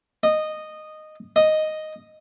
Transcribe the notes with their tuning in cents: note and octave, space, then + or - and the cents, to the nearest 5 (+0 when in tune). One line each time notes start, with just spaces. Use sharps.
D#5 -10
D#5 +0